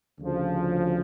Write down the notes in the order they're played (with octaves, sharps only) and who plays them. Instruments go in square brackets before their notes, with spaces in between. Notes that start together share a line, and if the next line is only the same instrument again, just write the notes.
[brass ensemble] D2 C#3 F3